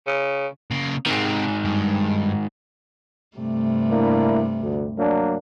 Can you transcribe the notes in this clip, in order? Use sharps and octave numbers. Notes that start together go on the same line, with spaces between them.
C#3
C#3 A#3
G#2 C3 D#3 C4
G2
G2 C3 A3
A#3 D4 E4
D2
F#3 A#3 D4